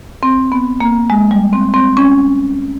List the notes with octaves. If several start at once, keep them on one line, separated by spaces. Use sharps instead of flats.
C4
B3
A#3
G#3
G3
C4
C4
C#4